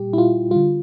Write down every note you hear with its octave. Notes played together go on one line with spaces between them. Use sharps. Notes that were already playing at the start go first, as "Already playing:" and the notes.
Already playing: A#2 G3 G4
E4
F4
D3 G3 F4